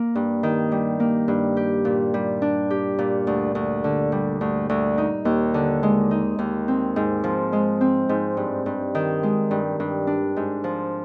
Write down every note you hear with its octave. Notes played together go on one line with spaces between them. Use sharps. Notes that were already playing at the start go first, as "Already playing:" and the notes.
Already playing: A#3
G2
D#3
G3
A#3
G2
G4
A#2
G3
D4
G4
A#2
D2
D2
D3
G3
D2
D2
D#4
D#2
D3
G#3
D#4
D#2
C4
G#2
F3
G#3
C4
G#2
G2
G2
D#3
G#3
G2
G2
D4
G#2
F3